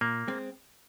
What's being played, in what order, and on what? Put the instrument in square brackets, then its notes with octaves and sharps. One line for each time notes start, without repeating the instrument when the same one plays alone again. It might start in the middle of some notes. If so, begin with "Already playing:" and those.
[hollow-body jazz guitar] A#2 [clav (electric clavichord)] A#3
[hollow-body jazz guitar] G#3 C4